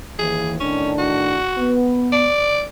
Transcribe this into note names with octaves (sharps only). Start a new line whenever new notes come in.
D#2 E3 G#4
A2 D#3 C#4 D4
F#4
B3
D5